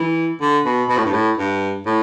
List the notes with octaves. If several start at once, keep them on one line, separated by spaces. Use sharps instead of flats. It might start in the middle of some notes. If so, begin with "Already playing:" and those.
Already playing: E3
D3
B2
B2
A2
G2
A2
G2
A2